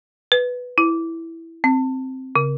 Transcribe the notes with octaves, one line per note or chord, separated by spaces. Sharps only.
B4
E4
C4
C#3